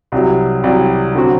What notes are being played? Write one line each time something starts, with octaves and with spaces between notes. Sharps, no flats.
C2 C3 F#3
C2 C3 F#3
D3 F#3 C4 F#4